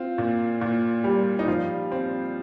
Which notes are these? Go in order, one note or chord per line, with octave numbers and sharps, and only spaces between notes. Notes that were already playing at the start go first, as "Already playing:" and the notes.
Already playing: C4 F4
A#2
A#2
G3
D#4
F3 F4
C4